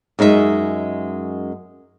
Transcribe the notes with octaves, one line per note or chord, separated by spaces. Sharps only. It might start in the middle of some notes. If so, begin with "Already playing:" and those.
F#2 G#3 D#4 E4 E5